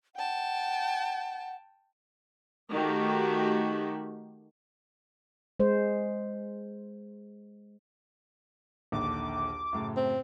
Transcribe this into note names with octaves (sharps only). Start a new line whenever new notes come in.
F#5 G5 A5
D#3 A3 F#4 G4
G#3 C5
A#1 D#2 D3 D6
F#2 A2 C#3
C4